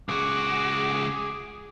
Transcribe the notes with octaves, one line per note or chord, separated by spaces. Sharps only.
C#2 F#4 G#4 D6